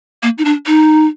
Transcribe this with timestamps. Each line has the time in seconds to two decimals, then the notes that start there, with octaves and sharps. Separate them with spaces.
0.23 A#3
0.38 D#4
0.45 D4
0.67 D#4